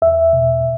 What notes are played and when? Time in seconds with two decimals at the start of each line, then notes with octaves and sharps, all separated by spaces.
0.02 E2 E5
0.33 B2